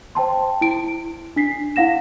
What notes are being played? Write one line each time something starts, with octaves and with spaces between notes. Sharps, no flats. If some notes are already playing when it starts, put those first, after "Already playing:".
C5 G5 A5 C6
E4 D7
D4 B6 C7
E4 F5 F#5 A#6 E7